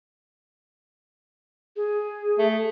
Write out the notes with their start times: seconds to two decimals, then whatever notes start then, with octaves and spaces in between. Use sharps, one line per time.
1.76 G#4
2.39 A3